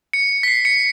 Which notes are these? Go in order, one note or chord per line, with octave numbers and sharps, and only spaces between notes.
C#7
B6
C7
C#7